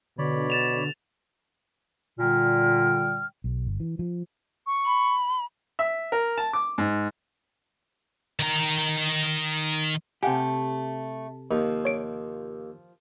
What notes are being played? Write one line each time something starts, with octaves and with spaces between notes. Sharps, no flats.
B2 D3 C#5 D5 B5
A6 E7 F7
A#2 D3 G3 G5 F6
B1
G1
E3
F3
C#6
B5
E5
A#4
A5
D6
G#2
D#3 A#5
C3 A3 G4 F#5 G#5
D#2 F3
C#5 D7